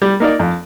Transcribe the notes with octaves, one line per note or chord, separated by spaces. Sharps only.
G3
A#3 D#4 A#4 D5
F2